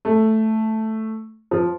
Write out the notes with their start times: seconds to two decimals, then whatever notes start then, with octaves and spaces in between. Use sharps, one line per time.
0.05 A3
1.51 F3